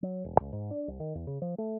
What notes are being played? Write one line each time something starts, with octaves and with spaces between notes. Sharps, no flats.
F#3
E1
C#2
G#2
D4
C2
D#3
E2
C#3
F3
A3